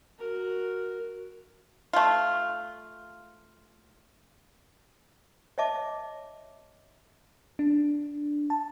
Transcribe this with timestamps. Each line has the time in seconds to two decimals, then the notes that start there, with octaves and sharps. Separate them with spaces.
0.19 F#4 A#4
1.93 A3 F4
5.58 C#5 D#5 E5 A5 D6
7.59 D4
8.50 A5